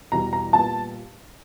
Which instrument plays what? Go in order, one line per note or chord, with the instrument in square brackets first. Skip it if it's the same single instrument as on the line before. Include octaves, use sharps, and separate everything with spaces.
[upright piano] E2 B2 G3 A#5
A#5
A#2 G3 B3 A5